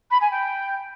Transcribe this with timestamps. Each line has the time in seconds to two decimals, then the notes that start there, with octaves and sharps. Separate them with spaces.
0.11 B5
0.21 G#5
0.31 G5